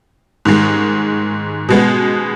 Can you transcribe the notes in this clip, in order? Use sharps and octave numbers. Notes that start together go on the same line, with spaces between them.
G#2 D#3 G#3
B2 G#3 B3